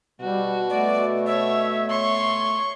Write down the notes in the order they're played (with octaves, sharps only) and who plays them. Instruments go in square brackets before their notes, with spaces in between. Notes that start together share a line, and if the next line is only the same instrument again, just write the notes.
[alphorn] B2 [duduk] G3 [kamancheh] F#4
[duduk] A3 [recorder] D5
[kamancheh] C#5 [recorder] E5
[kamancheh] C#5 C6 [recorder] C#6